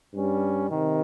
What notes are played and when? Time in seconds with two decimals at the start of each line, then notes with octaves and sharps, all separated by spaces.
0.13 G2 G3 C#4
0.71 C3 D#3